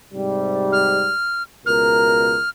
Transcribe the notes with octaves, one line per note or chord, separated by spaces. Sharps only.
G#2 C3 G3
F6
C#2 B2 A#4 F6